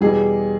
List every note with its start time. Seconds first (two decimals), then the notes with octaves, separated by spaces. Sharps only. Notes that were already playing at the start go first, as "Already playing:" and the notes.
0.01 E2 B2 G3 G#4